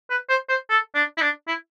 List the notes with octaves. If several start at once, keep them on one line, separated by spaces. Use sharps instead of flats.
B4
C5
C5
A4
D4
E4
D4
E4